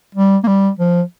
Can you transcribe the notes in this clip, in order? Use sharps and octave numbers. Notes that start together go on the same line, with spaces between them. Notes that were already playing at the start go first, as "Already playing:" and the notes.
G3
A#3
G3
F3